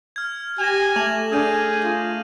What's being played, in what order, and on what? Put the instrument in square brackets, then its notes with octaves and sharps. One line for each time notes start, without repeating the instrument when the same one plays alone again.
[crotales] F6 G#6
[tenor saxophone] G4 [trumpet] G#5 [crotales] A#6 E7 F7
[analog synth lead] A3 [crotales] D6 F7 F#7
[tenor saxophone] D4 [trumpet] G#4 [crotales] F6 G6 D#7
[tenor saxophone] F4